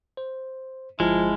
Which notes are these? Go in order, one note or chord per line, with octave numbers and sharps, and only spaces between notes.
C5
G1 F3 G#3 E4 A5 F6